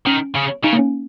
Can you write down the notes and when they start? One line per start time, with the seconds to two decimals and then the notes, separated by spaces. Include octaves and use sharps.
0.07 D#3 C#4
0.35 C#3
0.64 C#3 D#4
0.73 A#3
0.79 C#4